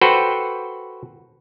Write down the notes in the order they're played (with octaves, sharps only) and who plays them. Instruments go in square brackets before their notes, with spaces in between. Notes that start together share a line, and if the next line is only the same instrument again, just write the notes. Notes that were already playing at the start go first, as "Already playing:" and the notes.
[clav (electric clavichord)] F#4 A4 B4 C5 G5